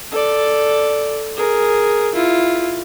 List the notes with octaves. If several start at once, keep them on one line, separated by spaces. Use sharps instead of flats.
A4 D5
G#4 A#4
E4 F4